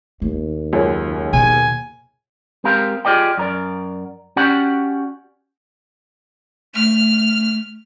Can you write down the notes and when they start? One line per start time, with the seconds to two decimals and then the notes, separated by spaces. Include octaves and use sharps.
0.22 D#2 A3
0.73 C#2 F#2 F#3
1.33 D#2 B2 G#5
2.64 G#3 C4 G4 A#4 F5
3.05 F4 G4 G#4 D5 D#5 G5
3.38 F#2 A#4 D5
4.36 C#4 F#4 G4 D5 F#5
6.74 A3 F6